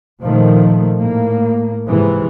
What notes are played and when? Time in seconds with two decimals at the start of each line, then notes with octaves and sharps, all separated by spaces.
0.23 A#2 D#3 F3 A3
0.97 A2 A#3
1.88 G#2 C3 E3